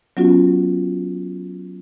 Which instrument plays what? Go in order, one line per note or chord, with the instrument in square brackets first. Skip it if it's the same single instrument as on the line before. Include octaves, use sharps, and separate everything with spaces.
[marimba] F#3 B3 C#4 F4 F#4